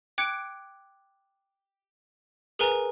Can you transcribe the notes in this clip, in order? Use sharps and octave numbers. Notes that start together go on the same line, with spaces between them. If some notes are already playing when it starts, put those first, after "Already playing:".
G5 D6 F#6 G#6 C#7 D7
G#4 A#4 B4 G#5 A#5